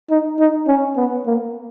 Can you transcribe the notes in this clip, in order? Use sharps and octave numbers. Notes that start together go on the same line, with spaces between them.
D#4
D#4
C#4
B3
A#3